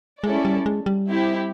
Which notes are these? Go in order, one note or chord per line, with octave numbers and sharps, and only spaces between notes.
G#3 C#4 E4 A4 D5
G3
G#3
G3
C4 E4 G4